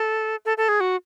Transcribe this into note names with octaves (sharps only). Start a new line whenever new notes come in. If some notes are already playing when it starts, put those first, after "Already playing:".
Already playing: A4
A4
A4
G#4
F#4